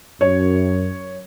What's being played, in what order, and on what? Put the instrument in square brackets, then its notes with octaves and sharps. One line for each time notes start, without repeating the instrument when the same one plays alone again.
[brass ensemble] F#2 [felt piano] C#5